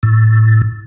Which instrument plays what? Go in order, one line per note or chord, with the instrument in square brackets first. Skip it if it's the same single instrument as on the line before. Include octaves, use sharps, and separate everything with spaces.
[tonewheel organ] A2